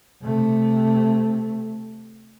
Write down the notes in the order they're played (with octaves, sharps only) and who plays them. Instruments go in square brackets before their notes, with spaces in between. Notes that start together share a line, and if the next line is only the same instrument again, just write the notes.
[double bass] C3 A3